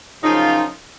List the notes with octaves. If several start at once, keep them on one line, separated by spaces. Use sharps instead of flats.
F#2 C#3 F3 D#4 F4